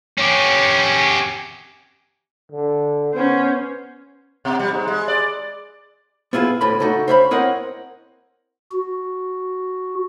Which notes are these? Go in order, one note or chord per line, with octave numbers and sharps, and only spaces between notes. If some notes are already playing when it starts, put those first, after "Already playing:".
C#4 G4
D3
B3 C#4 C5
B2
G3
G#2
G#3
D5
B3 E4 F4 G4 G#4
D2 A2 B5
C#3 A3 D4 D#4 F#4
C5 C#5 E5 F5 G5 B5
C4 E4 A#4 C#5 D#5 F#5
F#4